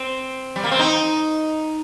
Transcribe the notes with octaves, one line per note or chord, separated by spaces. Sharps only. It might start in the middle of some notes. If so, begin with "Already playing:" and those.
Already playing: C4
G3
A#3
C4
D#4